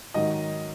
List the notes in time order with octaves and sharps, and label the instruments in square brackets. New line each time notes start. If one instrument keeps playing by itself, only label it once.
[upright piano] G#2 D#3 F#3 D#5